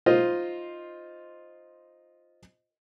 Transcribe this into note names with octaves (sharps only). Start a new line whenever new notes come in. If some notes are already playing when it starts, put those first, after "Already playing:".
D#4 F4 C5 D#5